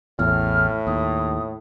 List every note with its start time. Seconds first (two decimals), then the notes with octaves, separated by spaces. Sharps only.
0.19 A1 E2 A2 F6
0.87 D#2 D#6